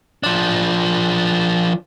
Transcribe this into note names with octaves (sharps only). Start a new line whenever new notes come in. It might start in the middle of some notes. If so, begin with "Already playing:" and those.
F3 D4